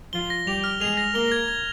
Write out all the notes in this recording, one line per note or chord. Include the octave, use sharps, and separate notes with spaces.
F3 F4 G7
A#6
G3 G4 F7
F6
G#3 G#4 F7
A#6
A#3 A#4 G7
G#6
G#6